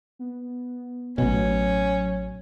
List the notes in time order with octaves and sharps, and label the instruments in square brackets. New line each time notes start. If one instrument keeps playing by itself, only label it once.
[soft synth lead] B3
[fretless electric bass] A1 B2 [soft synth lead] F#3 [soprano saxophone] C#4